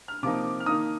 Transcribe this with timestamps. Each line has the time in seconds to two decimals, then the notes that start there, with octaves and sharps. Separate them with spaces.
0.08 F6
0.23 C3 F3 A#3 D#4 D6
0.60 F6
0.66 D#3 A#3 D#4 D#6